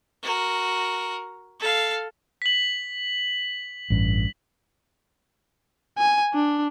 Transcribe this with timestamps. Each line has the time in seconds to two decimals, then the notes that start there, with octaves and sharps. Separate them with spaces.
0.23 F#4 A#4
1.60 A4 F5
2.42 B6 F#7
3.90 A1 G2
5.98 G#5
6.34 D4